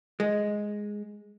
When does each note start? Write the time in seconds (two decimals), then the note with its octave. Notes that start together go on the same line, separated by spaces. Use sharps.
0.20 G#3